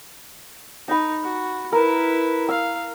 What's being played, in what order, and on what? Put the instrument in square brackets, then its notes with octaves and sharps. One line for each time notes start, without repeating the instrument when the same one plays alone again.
[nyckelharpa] D#4 [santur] A#5 B5
[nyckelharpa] F#4
[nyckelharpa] E4 B4 [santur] A#4
[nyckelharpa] F5 [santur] E6